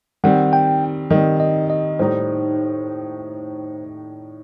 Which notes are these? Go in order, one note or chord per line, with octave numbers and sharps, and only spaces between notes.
D#3 G3 C4 F#5
G5
D#3 G3 C4 D#5
D#5
D#5
A2 G3 D#4 C5